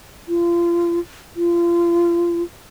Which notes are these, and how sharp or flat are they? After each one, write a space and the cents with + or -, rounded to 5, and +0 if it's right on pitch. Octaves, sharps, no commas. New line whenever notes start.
F4 -30
F4 -30